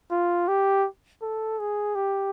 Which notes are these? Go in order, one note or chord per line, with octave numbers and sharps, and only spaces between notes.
F4
G4
A4
G#4
G4